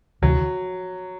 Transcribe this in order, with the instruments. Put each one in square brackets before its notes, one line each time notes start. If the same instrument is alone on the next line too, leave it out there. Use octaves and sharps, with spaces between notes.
[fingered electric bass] D2 C3 E3 [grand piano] F#3